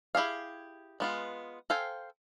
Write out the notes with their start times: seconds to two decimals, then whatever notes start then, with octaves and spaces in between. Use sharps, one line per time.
0.15 E4 G4 G#4 F5
1.00 G#3 B3 F4
1.70 A4 C5 F5 G5 G#5